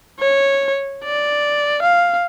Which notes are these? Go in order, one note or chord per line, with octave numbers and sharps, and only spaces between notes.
C#5
D5
F5